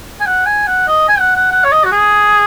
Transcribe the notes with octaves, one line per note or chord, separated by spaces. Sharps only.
G#5
F#5
G#5
F#5
D#5
G#5
F#5
F#5
F#5
C#5
D#5
F#4
G#4